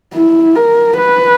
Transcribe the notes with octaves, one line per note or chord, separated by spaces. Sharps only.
E4
A#4
B4